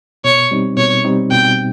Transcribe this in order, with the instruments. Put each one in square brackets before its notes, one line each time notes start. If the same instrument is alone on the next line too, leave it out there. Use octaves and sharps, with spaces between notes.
[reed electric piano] B2 [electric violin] C#5
[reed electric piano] G3 C4 D#4
[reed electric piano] B2 [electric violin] C#5
[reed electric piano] G3 C4 D#4
[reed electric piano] B2 [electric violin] G5